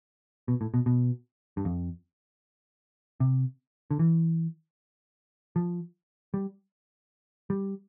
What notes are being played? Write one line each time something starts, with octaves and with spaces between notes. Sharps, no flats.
B2
A2
B2
B2
G2
F2
C3
D3
E3
F3
G3
G3